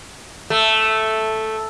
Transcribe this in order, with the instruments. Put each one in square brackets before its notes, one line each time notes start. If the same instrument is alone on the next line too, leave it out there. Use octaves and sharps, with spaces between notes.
[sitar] A3